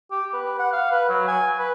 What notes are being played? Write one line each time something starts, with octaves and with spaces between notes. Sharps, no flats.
G4
B4
F#5
F5
B4
F#3
G#5
B4